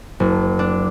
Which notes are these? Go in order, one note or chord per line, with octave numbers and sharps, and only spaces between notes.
F#1
D4